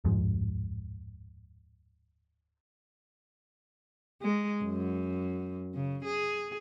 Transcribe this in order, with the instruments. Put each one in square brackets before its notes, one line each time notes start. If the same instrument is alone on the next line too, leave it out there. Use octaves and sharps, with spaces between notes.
[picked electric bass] D1 F2 G#2 F3
[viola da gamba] G#3
F#2
C#3
G#4